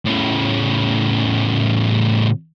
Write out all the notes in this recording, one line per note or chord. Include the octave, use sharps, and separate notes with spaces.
A2 C#3